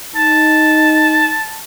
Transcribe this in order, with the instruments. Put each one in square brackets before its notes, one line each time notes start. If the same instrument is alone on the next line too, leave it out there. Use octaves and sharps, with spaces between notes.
[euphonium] D#4 [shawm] A5